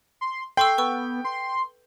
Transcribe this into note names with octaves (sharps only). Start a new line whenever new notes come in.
C6
A4 G5 C6 C#6 E6
B3 B4 C#6 E6
C6